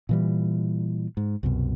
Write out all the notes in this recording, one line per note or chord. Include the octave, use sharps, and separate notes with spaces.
A#2 E3 G3
G#2
C2 F#2 B2